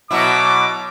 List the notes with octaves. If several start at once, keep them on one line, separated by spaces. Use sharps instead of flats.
B2 F#3 E4 D6